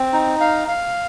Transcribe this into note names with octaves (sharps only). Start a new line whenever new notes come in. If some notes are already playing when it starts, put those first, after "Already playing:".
Already playing: C4
D#4
F5
F5